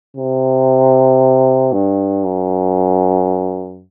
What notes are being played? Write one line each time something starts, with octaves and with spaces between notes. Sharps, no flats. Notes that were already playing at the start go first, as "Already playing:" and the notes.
C3
G2
F#2